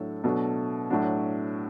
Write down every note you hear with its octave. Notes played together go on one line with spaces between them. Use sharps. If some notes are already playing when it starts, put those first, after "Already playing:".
Already playing: A2 F#3 D4 A4
B2 F#3 A3 D4 A4
A2 F#3 D4 F#4